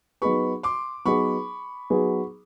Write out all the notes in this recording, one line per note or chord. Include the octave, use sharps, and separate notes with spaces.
F#3 B3 D#4 G#4 B4 B5 C#6
C6 D6
F#3 B3 D#4 G#4 B4 B5 C#6
F#3 B3 D#4 G#4 B4